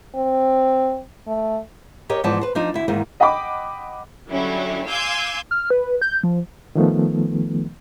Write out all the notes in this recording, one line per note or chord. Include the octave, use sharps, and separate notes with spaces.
C4
A3
G4 A#4 C#5 D#5
G#2 E3 F3 B3 D5 A5
B4 C5
F3 D4 D#4 D#5
D2 E4
E2 G#2 D#3 A#3
D#5 F#5 G5 B5 D6
D3 F#3 G3 C#4 E4
F5 G#5 C6 D6 E6 G6
F6
B4
G6
F3
D#3 F3 A3 B3